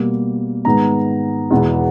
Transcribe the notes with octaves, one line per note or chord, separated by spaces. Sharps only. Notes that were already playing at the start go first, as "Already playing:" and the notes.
Already playing: B2 G3 A#3
G#2 D#3 G#3 B3 A#5
E2 B2 G#3 B3